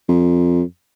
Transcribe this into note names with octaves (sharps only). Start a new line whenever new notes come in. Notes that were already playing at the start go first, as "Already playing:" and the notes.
F2